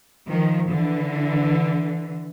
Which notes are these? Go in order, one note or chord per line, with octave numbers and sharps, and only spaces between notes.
D#3 F3
D3 E3